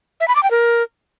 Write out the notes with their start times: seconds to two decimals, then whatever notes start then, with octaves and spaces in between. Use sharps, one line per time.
0.20 E5
0.28 B5
0.36 D6
0.43 G5
0.51 A#4